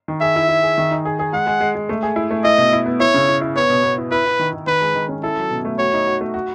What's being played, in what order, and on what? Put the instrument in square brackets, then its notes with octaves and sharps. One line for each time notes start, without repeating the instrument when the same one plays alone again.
[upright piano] D#3
[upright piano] G#4 [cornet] E5
[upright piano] E4
E4
G#4
D#3
D#4
G#4
G#4
[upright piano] G#3 [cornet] F#5
[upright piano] G#3
G#3
G#3
A3
G#4
E4
A3
[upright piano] E4 [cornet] D#5
[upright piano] B2
E4
B3
[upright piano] E4 [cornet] C#5
[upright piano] C#3
E4
E4
[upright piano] B3 [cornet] C#5
[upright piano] B2
B3
E4
[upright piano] E4 [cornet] B4
[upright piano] E4
D#3
D#3
[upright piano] D#3 [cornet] B4
[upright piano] G#3
D#3
C#4
[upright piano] E4 [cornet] A4
[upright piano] F#3
B2
A3
[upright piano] F#4 [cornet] C#5
[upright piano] D#4
F#4
A3
F#4